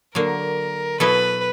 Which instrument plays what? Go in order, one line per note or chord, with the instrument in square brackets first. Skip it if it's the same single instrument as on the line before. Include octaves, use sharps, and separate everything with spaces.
[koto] D3 F#3 A#3 [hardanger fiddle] A#4
[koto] B2 F#3 B3 E4 A4 [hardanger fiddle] B4